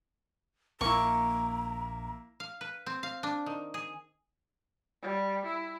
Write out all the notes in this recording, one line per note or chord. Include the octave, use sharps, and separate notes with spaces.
A#1 A#3 E4 A#5 C#6
F5
B4
C4
F5
D4
D#3
G#4
G3
E4